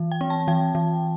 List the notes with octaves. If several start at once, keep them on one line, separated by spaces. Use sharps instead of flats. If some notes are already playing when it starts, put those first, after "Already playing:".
Already playing: E3
G5
C4
A5
E3 G5
E3